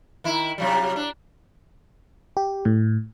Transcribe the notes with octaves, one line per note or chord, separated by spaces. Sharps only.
D#3 E4
C3 F#3 G3
D4
G4
A2